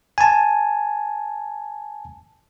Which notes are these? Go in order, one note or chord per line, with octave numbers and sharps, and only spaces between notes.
G#5 A5